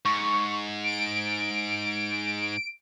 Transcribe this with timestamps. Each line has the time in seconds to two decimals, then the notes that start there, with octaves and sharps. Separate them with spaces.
0.05 G#2 C#6
0.84 D7